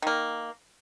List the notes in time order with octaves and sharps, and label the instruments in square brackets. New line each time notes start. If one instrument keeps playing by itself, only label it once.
[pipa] D#3 A#3